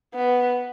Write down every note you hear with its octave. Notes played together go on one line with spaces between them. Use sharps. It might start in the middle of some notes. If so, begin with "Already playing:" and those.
B3